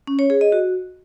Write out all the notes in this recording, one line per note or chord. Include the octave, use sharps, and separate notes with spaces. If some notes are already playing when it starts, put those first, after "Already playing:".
C#4
C#5
G#4
D#5
F#4